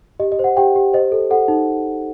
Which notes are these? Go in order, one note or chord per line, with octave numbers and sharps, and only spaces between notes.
G4 D#5
D#5
C5
F#5
G4 G5
G4
C5 D#5
A4
A4 F#5
D#4